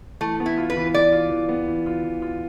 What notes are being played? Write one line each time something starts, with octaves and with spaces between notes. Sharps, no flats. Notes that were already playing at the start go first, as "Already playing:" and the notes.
E3 A3
B3
E4
F4
B4
E3
B3 D5
F4
E3
B3
E3
F4
E3
F4